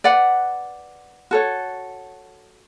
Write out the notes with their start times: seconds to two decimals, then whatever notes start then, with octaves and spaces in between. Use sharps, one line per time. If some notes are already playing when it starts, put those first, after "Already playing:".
0.04 B4 D5 F#5
1.31 F#4 A4 C#5